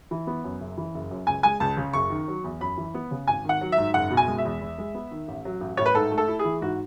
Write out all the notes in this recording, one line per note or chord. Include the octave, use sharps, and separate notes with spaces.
E3
B3
F#2
F#1
E3
F#1
F#2
C#2 G#5
G#3 G#5
C#2 A5
C#3
F#1 C#6
D#3
F#3
E2
F#2 B5
E3
B3
C#3
G#1 G#5
D#3 F#5
F#3
E5
G#2
F#1 F#5
B2
G#5
G#3
E5
E2
E2
G#3
B3
D#3
A1
F#3
A1
A2 C#5
B4
G#2 A4
A3
A4
E4
G#4
E3
G#2 F#4